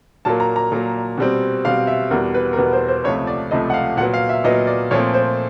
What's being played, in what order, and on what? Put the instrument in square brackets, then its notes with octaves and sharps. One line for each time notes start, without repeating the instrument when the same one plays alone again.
[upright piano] A#2 F#3 A#3 A5
A#5
A#5
A#2 F#3 A#3
B2 G3 C4
B2 G3 C4 F5
E5
E2 B2 G3 B3 A#4
B4
A#4
E2 B2 G3 B3 B4
C5
C5
C#2 C3 F3 A3 C#5
D5
C#2 C3 F3 A3 D#5
F#5
F5
A#2 F#5
F#3 B3
F5
E5
A#2 F#3 B3 D#5
D5
A#2 F3 A3 C4 C#5
C5